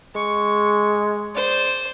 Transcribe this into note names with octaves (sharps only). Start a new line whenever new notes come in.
G#3 C#6
C5 D5